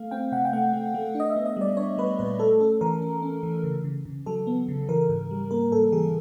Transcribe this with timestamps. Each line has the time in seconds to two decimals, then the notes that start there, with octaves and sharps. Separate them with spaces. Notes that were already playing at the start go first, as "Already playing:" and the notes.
Already playing: A3 F5
0.11 C4 G5
0.32 C3 F#5
0.45 G5
0.53 A3 F#5
0.73 A3
0.94 A3
1.15 D4 D#5
1.30 E5
1.36 B3
1.46 D#5
1.57 G3 D5
1.77 D4 C#5
1.98 G3 B4
2.19 A#2 B4
2.39 A3 A4
2.60 C#4 A4
2.81 E3 A#4
3.01 C#4
3.22 C#4
3.43 E3
3.64 C#3
3.84 C#3
4.05 C#3
4.26 F#3 A4
4.47 B3
4.68 C#3
4.88 E3 A#4
5.09 G#2
5.31 G3
5.51 A#3 A#4
5.72 G#2 A4
5.92 E3 G#4